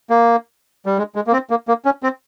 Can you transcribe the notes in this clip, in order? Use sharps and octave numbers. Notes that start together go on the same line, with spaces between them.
A#3
G3
G#3
G#3
A#3
C4
A#3
A#3
C#4
C4